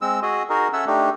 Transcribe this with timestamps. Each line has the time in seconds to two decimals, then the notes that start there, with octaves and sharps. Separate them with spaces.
0.01 G#3 C4 E6
0.22 F#4 G#4 D#5
0.50 D#4 F#4 G#4 A#4
0.73 C#4 A4 C#5 E5 F#5 E6
0.87 A3 D4 D#4 G4